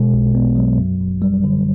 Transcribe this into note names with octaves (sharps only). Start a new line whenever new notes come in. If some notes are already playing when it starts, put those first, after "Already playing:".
Already playing: B2 G#3
B1
B3
F#3
F#2
G1
G3
D3